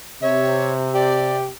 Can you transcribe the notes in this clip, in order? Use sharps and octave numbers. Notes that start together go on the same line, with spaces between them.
C3 C#5 E5
G4 D5